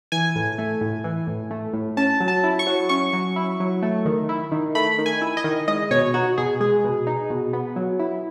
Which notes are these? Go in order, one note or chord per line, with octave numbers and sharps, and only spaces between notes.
E3 G#5
A2
A3
A2
E3
A2
A3
A2
C#4 A5
F#3
A5
E4
C#6
F#3
C#4 C#6
F#3
E4
F#3
A3
D#3
E4
D#3
A3 B5
D#3
G#5
E4
D#5
D#3
G#3 D#5
B2 C#5
D#4 F#4
B2 G#4
G#3 G#4
B2
D#4
B2
B3
F#3
E4